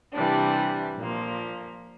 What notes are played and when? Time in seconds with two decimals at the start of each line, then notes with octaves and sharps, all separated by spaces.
0.13 C3 E3 G3 D4
0.97 A#2 F3 A#3